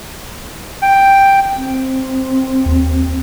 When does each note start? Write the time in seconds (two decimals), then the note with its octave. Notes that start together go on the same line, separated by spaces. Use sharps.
0.82 G5
1.55 C4
2.66 D#2